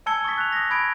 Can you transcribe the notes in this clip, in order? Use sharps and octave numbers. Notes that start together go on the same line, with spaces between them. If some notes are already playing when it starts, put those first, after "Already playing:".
G#5 A5 E6 G#6 C#7 G7
C#6 D#6 A6 B6
F#6 F7
D#6 A#6
B5 D#6 G#6 D7